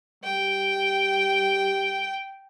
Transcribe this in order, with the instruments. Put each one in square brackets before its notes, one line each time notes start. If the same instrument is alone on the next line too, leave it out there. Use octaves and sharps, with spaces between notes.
[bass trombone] G3 [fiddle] G5